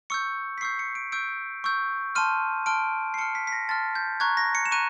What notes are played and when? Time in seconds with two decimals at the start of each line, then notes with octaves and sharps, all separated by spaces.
0.10 C#6 E6 G6 C#7
0.58 B6
0.61 C#6 E6 G6 C7
0.79 C#7
0.95 D7
1.12 C#6 E6 G6 D7
1.64 C#6 E6 G6
2.15 A5 C6 F6 D#7
2.66 A5 C6 F6 D7
3.14 C7
3.18 A5 C6 F6 C#7
3.35 B6
3.47 B6
3.52 A#6
3.69 A5 C6 F6 A6
3.95 G6
4.20 A#5 C#6 F#6 G#6
4.37 A#6
4.55 C#7
4.66 E7
4.71 A#5 C#6 F#6 D#7